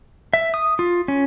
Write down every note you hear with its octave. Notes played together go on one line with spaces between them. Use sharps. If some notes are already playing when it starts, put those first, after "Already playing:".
E5
D#6
F4
C#4